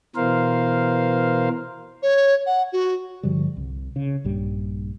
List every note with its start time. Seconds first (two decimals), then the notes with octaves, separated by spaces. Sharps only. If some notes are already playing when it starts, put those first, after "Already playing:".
0.16 B2 E3 A#4 C5 F5
2.02 C#5
2.46 F#5
2.73 F#4
3.23 G2 D3 F3 G3
3.57 C2
3.96 C#3
4.24 A#1 G2 G3